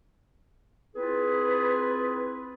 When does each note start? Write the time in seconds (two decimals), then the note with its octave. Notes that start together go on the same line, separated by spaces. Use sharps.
0.95 C4 E4 F4 G#4 B4